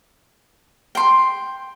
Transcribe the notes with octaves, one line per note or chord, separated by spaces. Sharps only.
G5 C6